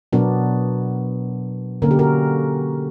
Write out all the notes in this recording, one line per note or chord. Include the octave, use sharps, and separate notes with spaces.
B2 F#3 B3 D4 F#4 A#4
D3 A#3 C#4 A#4
G4
F#4 A#4